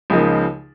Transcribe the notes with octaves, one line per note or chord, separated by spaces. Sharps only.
C#2 C#3 F3 A#3 D#4